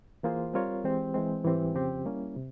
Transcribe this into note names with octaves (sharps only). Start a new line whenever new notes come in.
E3 A#3 F4 G#4 C5
G3 C4 F4 A#4 C#5
E3 G#3 C4 G4
E3 G#3 C4
G#2 E3 G3 C4 G4
F2 C#3 F3 C4 G4
G3 A#3 C#4 E4
C3